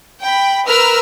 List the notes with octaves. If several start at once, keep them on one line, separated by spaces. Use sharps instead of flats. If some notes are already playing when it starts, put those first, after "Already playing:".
G5 B5
A#4 B4 E6 F6